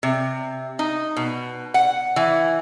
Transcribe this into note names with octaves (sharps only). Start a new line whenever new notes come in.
C3
D#4
B2
F#5
E3